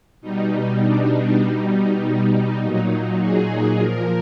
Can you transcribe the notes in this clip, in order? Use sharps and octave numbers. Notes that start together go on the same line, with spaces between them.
B2 G3 D#4
D4
B2 G3 D#4
A#2 F#3
G#4
A#2 F3 A#4